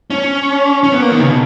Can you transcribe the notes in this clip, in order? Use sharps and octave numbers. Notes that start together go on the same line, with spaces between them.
C#4
C#4
B3
A#3
D#3
C#3
B2